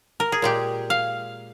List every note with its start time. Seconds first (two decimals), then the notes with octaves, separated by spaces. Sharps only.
0.20 A#4
0.32 G#4
0.42 A#2 G#3 G4
0.90 F5